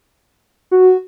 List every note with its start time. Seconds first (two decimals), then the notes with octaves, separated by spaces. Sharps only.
0.71 F#4